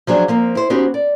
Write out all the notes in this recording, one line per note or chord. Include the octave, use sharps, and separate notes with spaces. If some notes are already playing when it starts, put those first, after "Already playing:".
F3 F#3 D4 G#4
F3 A#3 C4
E4 C5
B3 C#4 D#4 F#4 G4 C5
D5